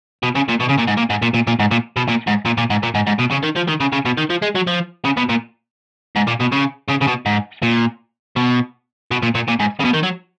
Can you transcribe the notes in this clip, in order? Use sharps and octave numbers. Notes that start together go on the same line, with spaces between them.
B2
C#3
A#2
B2
C#3
A#2
G#2
A#2
G#2
A#2
A#2
A#2
G#2
A#2
B2
A#2
G#2
A#2
A#2
G#2
A#2
G#2
G#2
B2
C#3
D#3
F3
D#3
C#3
C#3
B2
D#3
F3
G#3
F#3
F3
C#3
B2
A#2
G#2
A#2
B2
C#3
C#3
C#3
B2
G#2
A#2
B2
B2
A#2
A#2
A#2
G#2
C#3
B2
D#3
F#3